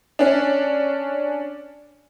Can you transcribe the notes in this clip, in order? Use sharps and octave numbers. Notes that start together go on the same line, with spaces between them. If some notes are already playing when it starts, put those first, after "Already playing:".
C#4 D4